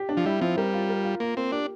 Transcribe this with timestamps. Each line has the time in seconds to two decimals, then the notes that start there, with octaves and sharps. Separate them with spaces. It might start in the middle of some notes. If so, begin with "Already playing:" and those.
Already playing: G4
0.09 D4
0.17 F3
0.25 G3 E4
0.41 F3 C4
0.57 G3 A#4
0.73 F4
0.89 A#4
1.04 F4
1.20 A#3 F4
1.37 A#3 C4
1.52 D4 G4